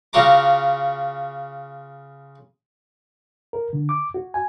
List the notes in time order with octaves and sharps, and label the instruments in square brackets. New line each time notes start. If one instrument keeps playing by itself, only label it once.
[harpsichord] C#3 F4 F#4 A#5 D6
[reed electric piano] A#4
D3
D6
F#4
G#5